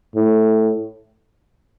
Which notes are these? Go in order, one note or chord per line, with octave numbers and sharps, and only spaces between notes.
A2